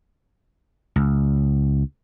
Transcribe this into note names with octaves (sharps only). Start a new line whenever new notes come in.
C#2